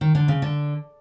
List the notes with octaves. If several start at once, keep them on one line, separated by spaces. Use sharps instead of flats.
D#3
D3
C#3
D3